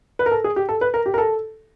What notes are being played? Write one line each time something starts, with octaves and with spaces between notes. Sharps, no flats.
B4
A#4
A4
G#4
G4
A4
B4
A#4
G4
A#4
A4